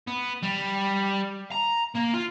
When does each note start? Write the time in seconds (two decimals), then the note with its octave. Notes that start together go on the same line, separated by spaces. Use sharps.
0.08 B3
0.43 G3
1.51 A#5
1.95 A#3
2.14 F4